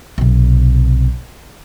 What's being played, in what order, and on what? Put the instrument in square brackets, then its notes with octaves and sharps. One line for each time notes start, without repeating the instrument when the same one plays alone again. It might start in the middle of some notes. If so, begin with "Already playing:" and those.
[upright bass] B1 C3